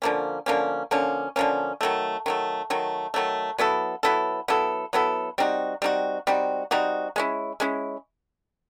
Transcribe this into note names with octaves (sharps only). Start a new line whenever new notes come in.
D3 F3 A#3 C#4
D3 F3 A#3 C#4
D3 F3 A#3 C#4
D3 F3 A#3 C#4
D#3 F#3 A3
D#3 F#3 A3
D#3 F#3 A3
D#3 F#3 A3
F#3 B3 E4 A4
F#3 B3 E4 A4
F#3 B3 E4 A4
F#3 B3 E4 A4
G3 C4 D#4 F#4
G3 C4 D#4 F#4
G3 C4 D#4 F#4
G3 C4 D#4 F#4
G#3 C#4 E4
G#3 C#4 E4